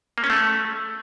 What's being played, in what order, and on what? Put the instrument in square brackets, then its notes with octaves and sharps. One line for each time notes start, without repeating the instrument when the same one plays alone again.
[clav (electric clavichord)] A#3
C#4
A3